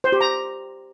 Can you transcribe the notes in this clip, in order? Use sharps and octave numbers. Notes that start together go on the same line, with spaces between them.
C5
G4
A#5